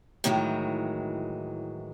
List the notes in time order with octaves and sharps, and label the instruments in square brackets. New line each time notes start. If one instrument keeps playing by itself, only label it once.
[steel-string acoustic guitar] A2 D#3 E3 F#3 G#3